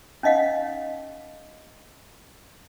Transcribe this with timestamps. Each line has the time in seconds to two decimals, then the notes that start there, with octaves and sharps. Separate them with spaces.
0.23 C#4 D#4 D#5 F5 F#5